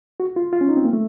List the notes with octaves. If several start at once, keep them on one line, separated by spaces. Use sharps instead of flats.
F#4
F4
F4
C#4
D#4
C4
A#3
A3